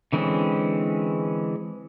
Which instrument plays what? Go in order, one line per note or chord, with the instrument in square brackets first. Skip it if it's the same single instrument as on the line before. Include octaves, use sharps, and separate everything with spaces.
[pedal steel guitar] D3 E3 G#3 C4 C#4